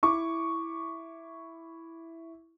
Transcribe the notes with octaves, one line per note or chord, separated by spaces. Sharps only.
E4 C#6 D6